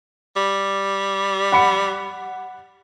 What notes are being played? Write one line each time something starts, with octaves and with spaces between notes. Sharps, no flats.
G3
F#5 B5 C#7